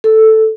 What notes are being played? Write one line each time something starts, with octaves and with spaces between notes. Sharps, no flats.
A4